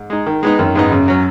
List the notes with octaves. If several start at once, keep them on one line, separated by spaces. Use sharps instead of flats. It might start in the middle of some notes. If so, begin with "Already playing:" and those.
Already playing: G#2
G#3 D#4
D#3
G#3 B3 D#4
F#2 D#3
G#2 G#3 B3 D#4
F#2 C#3
F#3 C#4